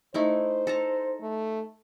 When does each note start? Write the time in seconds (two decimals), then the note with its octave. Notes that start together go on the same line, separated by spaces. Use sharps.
0.14 A3 D#4 E4 C5
0.67 A4 A5 A#5
1.21 A3